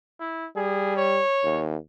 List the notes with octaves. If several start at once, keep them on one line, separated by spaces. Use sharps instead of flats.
E4
G3 G#4
C#5
D#2